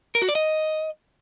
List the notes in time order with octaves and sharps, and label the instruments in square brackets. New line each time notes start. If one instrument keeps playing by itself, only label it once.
[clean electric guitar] A#4
F#4
D5
D#5